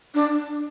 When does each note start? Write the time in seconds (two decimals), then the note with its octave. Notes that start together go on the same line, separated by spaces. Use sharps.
0.15 D4